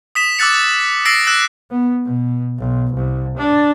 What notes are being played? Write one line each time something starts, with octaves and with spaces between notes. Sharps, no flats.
D#6 B6 E7
D6 E6 F#6 A6 C#7
E6 A6 A#6 C7 D7
E6 F#6 E7
B3
B2
B1
C2
D4